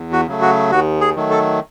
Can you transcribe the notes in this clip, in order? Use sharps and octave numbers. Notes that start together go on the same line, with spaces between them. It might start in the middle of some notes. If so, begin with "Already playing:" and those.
Already playing: E2
F#4
C#3 F#3 A3
F#4
D#2 F#4
G#4
D#3 F#3 A3
A4